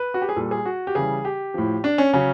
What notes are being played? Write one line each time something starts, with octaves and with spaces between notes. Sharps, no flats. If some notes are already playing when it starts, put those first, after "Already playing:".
Already playing: B4
F#4
G4
G#4
A#2 G3 A4
G#4
F#4
G4
C#3 E3 G3 G#4
G4
A2 F3
D4
C#4
C#3 F#3 C#4